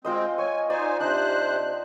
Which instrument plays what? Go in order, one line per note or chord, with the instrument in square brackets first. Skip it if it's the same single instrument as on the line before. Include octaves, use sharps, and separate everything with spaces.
[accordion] G#3 C4 [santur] F4 C5 D#5
[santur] C#5 [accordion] G#5
[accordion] D#4 C5 G#5 [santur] D5
[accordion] C3 C5 F#6 [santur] D4 D#4